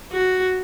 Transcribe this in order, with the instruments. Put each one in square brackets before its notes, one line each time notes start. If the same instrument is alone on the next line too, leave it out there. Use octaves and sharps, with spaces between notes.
[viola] F#4